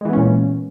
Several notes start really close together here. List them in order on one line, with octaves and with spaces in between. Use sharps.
G#3 E3 B3 C#4 A#2